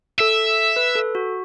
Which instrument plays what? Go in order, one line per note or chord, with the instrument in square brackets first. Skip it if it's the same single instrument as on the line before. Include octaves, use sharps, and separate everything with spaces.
[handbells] A4 [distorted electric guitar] E5
[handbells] B4
A4
F#4